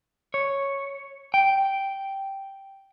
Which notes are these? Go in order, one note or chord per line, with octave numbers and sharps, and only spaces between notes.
C#5
G5